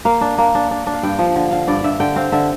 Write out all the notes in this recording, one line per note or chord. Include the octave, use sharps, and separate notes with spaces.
A#3 F5
D4
A#3
D4
D4
D4
F5
G2 G5
F3
D3
D3 F5
G2 D5
G2 E5
D3 G5
C4 F5
D3 E5